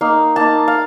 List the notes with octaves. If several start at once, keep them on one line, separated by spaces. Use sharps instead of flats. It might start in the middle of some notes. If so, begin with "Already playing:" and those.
A#3 D#4 F5
A#3 D#4 A5
F5